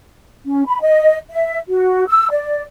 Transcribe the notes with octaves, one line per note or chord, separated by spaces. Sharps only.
C#4
B5
D#5
E5
F#4
E6
D5